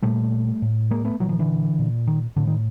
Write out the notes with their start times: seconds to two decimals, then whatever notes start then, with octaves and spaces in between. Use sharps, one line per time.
0.02 A#2 G3 A3
0.62 A2
0.91 G#3 A#3
1.05 A3 B3
1.20 A#2 E3 F#3
1.29 D#3 F3
1.39 D3 E3
1.79 A#2
2.07 D#3
2.36 A2 D3
2.47 D#3